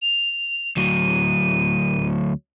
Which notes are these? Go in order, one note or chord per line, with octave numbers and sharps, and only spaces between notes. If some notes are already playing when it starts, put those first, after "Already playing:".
F7
D2 F#3 D#7